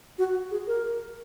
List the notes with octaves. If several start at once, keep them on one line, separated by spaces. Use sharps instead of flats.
F#4
G#4
A#4